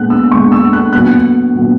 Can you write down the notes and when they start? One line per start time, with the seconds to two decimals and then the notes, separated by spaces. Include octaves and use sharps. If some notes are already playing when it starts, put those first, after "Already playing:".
Already playing: A#2 G#3 B3 F#6
0.10 E6
0.31 A#2 G#3 B3 C#6
0.52 E6
0.73 F#6
0.93 A#2 F#3 B3 F#6
1.55 A#2 F#3 B3